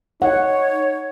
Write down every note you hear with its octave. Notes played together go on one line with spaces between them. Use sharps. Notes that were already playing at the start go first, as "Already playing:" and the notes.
D#4 C#5 F#5